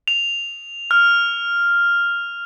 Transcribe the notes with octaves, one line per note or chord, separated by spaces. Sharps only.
F7
F6